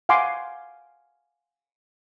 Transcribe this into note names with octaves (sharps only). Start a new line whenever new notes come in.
F5 F#5 G#5 C6 D6